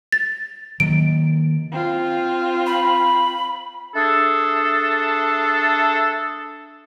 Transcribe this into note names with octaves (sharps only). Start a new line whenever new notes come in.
A6
D#3 F#3 A#3 D7
C4 F4
B5
A3 D4 G#4 A4